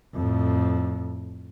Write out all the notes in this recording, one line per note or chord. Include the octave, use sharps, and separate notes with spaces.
F2 A2